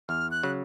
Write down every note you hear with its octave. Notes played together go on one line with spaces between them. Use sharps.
E2 F6
F#6
C#3 F#3